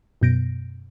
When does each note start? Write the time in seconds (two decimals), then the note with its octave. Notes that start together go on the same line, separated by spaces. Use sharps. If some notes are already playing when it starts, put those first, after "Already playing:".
0.21 F#2 B2 G6 A#6 D7